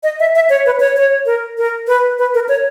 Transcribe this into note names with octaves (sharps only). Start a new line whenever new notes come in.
D#5
E5
E5
C#5
B4
C#5
C#5
A#4
A#4
B4
B4
A#4
C#5